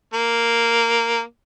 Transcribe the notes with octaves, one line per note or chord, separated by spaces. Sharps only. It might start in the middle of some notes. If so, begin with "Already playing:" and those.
A#3